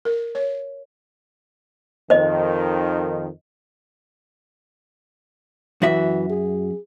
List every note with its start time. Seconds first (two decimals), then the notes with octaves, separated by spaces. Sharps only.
0.05 A#4
0.35 C#5
2.10 F2 D#3 C5 D#5
5.82 F#2 E3 F#4 E5
6.30 G#4